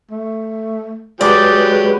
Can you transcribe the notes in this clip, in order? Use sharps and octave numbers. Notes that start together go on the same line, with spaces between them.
A3
F#3 G#3 G4 G#4 B4 D5